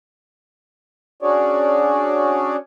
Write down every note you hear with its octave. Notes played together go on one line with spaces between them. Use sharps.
C#4 D4 F#4 G#4 C#5 D5